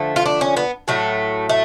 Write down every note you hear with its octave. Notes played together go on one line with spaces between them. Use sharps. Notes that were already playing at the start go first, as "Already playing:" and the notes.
Already playing: D3 F3 A3
F4
D4
C#4
B3
A2 F#3 A3
A3